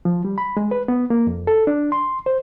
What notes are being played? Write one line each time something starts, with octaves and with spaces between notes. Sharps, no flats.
F3
G3
B5
G#3
B4
B3
A#3
F2
A4
D4
C6
C5